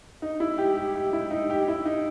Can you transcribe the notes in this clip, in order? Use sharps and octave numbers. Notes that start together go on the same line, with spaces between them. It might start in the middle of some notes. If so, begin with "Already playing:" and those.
D#4
E4
G4
G4
G4
E4
D#4
G4
E4
D#4